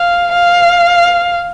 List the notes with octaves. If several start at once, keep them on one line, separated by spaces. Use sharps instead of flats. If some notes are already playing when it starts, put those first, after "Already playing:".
Already playing: F5
F5